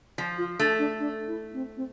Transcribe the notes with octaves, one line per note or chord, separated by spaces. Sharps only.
F3
F4
A3 D4
D4
D4
E4
C4
C4